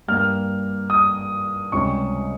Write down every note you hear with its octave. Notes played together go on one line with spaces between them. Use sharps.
G2 G3 A#3 F6
D#6
C#2 C3 G3 C#4 C#6